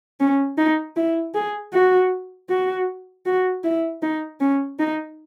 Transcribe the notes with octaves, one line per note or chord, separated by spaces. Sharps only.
C#4
D#4
E4
G#4
F#4
F#4
F#4
E4
D#4
C#4
D#4